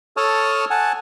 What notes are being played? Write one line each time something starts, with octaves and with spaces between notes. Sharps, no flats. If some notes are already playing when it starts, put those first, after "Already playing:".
A4 C#5 A5 C#6 D#6 F6
F#5 G#5 A5